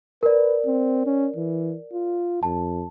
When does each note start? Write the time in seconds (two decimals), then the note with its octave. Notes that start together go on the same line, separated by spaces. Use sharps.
0.23 A#4 B4 D5
0.66 C4
1.06 C#4
1.36 E3
1.93 F4
2.43 F2 A5